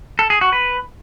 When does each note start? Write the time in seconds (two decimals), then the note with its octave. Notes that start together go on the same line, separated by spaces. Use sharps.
0.19 A4
0.30 G#4
0.41 F#4
0.53 B4